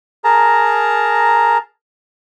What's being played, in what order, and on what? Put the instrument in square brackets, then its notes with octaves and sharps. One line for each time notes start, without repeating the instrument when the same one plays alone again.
[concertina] G#4 A#4 A5 A#5